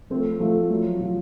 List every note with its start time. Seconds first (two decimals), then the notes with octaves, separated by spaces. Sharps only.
0.10 F3 A3 C4
0.40 F3 A3
0.70 F3 F#3
1.00 F3